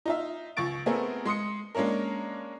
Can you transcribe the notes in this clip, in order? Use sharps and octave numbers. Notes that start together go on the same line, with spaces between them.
D#4 F4 E5
C#2 F3 C#6 A6 D7
A3 B3 C4 G#4 A#4
G#3 C6 D#6 C#7
G#3 A#3 C#4 D4 A#4